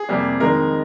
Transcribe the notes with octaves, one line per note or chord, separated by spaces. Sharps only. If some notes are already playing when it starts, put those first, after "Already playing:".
Already playing: G#4
F2 C3 G3 A#3
F2 D#3 G#3 A#4